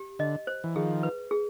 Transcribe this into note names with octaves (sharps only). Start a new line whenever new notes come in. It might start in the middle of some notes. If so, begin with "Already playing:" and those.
Already playing: G4
D3 D#5
C5
E3
D#3 F3 G#4
B4
G#4